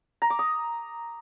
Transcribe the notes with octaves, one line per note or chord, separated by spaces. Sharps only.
A#5
D6
D#6